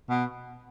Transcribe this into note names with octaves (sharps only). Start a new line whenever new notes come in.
B2